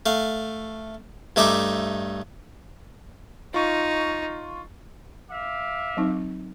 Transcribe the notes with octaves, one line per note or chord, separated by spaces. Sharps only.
A3 F5
G2 A3 D#4 E5 D6
D#4 F4 C#6
E5 F5 D6
F#3 C4 D#4